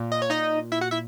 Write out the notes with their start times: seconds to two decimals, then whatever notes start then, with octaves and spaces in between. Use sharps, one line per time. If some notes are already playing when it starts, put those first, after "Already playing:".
Already playing: A#2
0.12 D#5
0.22 C#5
0.30 D#4 D#5
0.72 E4 E5
0.81 F#4 F#5
0.91 E4 E5